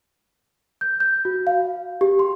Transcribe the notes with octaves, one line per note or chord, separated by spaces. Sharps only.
G6
G6
F#4
F5
G4
C6